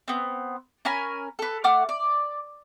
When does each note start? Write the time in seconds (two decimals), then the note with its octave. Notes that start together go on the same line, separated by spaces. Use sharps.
0.08 B3 C4
0.85 C#4 A#4 G#5 B5
1.39 A4 B4
1.64 A3 F#5 D6 F6
1.89 D5